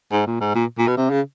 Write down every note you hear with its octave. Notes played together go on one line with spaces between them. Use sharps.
G#2
A#2
G#2
A#2
A#2
B2
C3
C#3